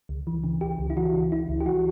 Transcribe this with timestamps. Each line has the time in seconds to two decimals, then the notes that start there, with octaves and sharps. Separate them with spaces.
0.09 C#2
0.27 E3
0.43 C#3
0.61 C#2 G4
0.79 C#2
0.90 E4
0.97 E3 F#4
1.14 C#3
1.32 C#2 E4
1.49 C#2
1.60 G4
1.66 E3 F#4